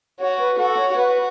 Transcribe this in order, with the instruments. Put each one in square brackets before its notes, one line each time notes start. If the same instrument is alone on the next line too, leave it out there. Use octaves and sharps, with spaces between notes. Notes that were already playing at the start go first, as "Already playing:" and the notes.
[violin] F#4 [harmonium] C#5
[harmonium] B4
[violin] F#4 [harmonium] A4
[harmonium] C#5
[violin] F#4 [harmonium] B4